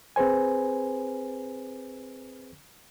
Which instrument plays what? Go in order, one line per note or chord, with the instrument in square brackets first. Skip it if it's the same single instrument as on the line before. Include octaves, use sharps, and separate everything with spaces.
[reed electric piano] C4 G#4 B4 C5 G#5